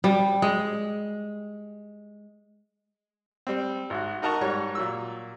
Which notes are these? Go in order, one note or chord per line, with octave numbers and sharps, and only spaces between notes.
G3
G#3
G3 C4
G#1 F#4
D#4 F#4 A#4 A5 A#5 C#6
G#2 G3 C#5 C#6
A#2 F#3 E6